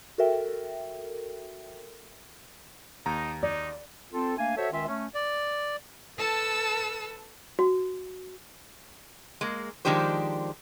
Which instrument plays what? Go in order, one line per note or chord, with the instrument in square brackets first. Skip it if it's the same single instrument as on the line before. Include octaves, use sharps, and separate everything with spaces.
[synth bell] F#4 A4 A#4 E5 G5
[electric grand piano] D#2 A#5 [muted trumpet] D#4
[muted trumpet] D#4 [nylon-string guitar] D5
[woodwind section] C4 F4 A4
A3 A#3 D4 F5 G#5
F#4 A4 C5 C#5 E5
C#2 D#3 C#4 F4 E5
A3 C#4
[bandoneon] D5
[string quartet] A4 B4 A5 E6
[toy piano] F#4
[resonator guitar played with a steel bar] G#3 A#3
D#3 F3 G#3 D4 G4 C5